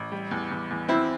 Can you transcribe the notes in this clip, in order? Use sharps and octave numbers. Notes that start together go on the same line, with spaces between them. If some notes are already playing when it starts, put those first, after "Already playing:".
Already playing: A1
G3
E2
E2
E2
C4 E4